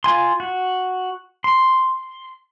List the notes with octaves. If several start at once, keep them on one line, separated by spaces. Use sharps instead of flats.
F4 G#5 C6
F#4
C6